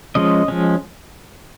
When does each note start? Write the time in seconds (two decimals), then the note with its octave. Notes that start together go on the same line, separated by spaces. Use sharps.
0.15 F3 G#3 C#4 D#5
0.48 F3 G#3 C#4